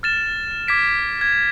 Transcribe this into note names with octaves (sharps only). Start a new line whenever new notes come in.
F6 A6 E7
D6 G#6 B6 D7
G#6